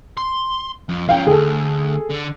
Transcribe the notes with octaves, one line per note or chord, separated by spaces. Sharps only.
C6
F2
F3 C#4 F5 G5
D2 G#4 A4
D3